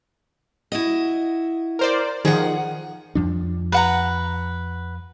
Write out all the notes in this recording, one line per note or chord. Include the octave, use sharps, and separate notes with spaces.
E4 F#4 D#5
A#4 C5 D5
D#3 F3 G#4 F#5
F2 F3 D4
B4 F#5 A#5